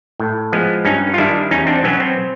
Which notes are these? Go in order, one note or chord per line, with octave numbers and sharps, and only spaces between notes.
A2
F3 G#3 B3
G2 C#4 D#4
F4
D#3 G3 D4 E4
E2 C#4 D#4
C4 D4
B2 F#3 B3 C#4
C4